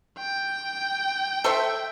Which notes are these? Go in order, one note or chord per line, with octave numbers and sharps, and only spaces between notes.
G5
A4 C5 E5